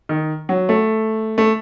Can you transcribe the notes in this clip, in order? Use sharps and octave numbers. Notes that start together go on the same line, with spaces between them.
D#3
F#3
A3
A3